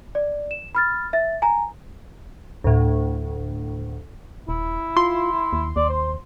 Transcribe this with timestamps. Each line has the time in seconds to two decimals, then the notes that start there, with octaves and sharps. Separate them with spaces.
0.15 D5
0.51 E7
0.75 B5 F6 A6
1.13 E5 A6
1.42 G#5 A#5
2.64 D2 A2
4.49 D#1 E4
4.97 F4 C6
5.53 D#2
5.76 D#2 D5
5.89 C5